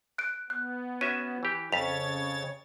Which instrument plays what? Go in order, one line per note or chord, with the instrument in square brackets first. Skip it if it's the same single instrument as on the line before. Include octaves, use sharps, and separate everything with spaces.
[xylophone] F#6 D7
[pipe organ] B3 [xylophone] F#6
[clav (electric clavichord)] C#4 F#4 E5 [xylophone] D#7
[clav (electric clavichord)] E3 G4
[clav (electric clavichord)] F2 [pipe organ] C#3 C#5 A6 [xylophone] B6 F7